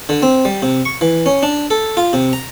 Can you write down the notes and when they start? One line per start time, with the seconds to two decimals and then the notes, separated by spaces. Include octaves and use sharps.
0.09 D3
0.22 C4
0.45 G3
0.62 C3
0.85 C#6
1.01 E3
1.26 C#4
1.43 D4
1.70 A4
1.97 F4
2.13 C3
2.33 A#5